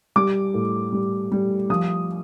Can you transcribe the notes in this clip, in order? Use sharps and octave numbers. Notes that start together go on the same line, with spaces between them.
G3 D6
A2
G3
G3
F3 D#6